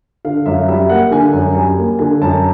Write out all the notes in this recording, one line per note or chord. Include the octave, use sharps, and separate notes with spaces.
D3 F5
F#2 E5
G3 E5
A#3 F#5
D3 G#5
F#2
G3 G#5
A#3
D3 G#5
F#2 A5